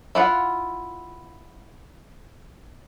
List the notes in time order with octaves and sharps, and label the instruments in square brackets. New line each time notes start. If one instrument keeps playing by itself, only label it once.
[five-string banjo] E4 F4 F#5